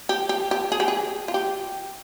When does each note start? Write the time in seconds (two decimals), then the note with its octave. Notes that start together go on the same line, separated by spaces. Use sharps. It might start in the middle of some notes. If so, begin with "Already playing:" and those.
0.09 G4
0.29 G4
0.51 G4
0.72 G#4
0.80 G4
0.88 G#4
1.28 F4
1.34 G4